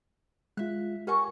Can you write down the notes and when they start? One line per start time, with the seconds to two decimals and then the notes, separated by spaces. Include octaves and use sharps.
0.57 G#3 F4 E5 F#6
1.07 C#4 F#4 G4 A#4 G#5 C#6